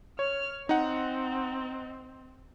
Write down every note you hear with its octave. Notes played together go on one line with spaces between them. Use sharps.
C#5 F6
C4 D#4 F#5